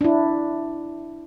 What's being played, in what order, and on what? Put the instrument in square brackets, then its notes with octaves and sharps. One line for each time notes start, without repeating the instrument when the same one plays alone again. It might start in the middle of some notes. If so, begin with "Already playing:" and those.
[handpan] D4 E4